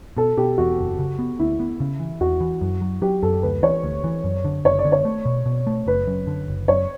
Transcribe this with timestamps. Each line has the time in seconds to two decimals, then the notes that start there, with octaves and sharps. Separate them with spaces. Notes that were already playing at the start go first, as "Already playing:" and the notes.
0.17 B2 A4
0.37 B2 G4
0.58 E2 F#4
0.78 F#1
0.99 C#3
1.19 B3
1.39 D2 E4
1.60 B3
1.80 C#3
2.00 E3
2.21 E2 F#4
2.40 E3
2.61 F#2
2.81 F#3
3.02 F#3 G4
3.22 F#2 A4
3.43 D2 B4
3.63 E3 C#5
3.83 D2
4.04 E3
4.24 F#2
4.45 D3
4.65 F#1 C#5
4.79 D5
4.85 D3
4.92 C#5
5.05 A3
5.25 B2
5.46 B2
5.67 A3
5.86 F#1 B4
6.07 F#2
6.27 D3
6.48 F#1
6.68 F#2 C#5